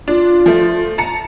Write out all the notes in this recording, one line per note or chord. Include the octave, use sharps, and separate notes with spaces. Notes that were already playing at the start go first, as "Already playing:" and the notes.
D4 F4
F3 A3
A5 A#5 C#7